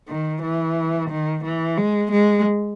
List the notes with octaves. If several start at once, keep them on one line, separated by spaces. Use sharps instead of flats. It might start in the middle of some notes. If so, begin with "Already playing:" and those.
D#3
E3
D#3
E3
G#3
G#3